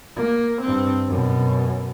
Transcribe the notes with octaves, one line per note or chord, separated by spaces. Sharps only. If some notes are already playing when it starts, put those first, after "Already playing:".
A#3
G2 C4
F#2 B2